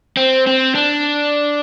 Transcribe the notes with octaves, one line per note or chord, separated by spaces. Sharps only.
C4
C4
D4